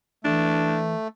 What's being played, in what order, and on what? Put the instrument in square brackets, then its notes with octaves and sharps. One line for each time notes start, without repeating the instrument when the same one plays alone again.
[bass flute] E3 [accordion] A3 [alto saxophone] D4